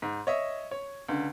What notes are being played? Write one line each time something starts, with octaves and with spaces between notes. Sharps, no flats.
G#2
C#5 D#5 E5
C#5
C#2 D3